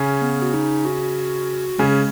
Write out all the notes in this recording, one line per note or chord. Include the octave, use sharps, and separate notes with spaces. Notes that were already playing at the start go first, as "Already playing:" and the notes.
Already playing: C#3 C#4
B3
F#4
D#4
F#4
C#3 G#3 C#4